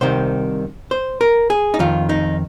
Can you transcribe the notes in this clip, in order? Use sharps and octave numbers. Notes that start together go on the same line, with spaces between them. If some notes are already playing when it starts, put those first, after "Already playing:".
C2 C3 D#3 C5
C5
A#4
G#4
D#4
F2 D#3 F4
D#4